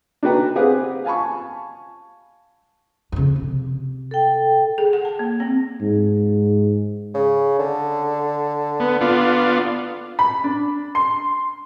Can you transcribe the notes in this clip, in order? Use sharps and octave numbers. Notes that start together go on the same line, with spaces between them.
D4 D#4 F#4 B4 G5 A#5
C4 G4 G#4 B4 F5 F#5
F5 G#5 A5 B5 C#6
F2 C#3
C3
A4 G5
G#4
F#5
A5
A#3
C4
G#2
C#3
D3
B3
B3 D4 F4
B5
D4
C6